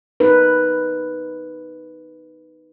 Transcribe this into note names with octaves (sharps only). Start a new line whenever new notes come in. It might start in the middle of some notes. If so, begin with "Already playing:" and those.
B3 D#4 A#4 B4